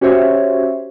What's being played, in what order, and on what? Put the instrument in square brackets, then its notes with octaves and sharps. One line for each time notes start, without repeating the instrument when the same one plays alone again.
[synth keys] C#4 F#4 G4 C5 C#5 E5